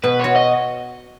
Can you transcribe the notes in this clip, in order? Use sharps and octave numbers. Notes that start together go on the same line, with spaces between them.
B2 B4
F#4 C#5
D#5